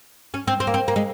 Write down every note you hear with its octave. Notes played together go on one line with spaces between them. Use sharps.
C#4
C4
C4
A#3
C4
A#3
G#3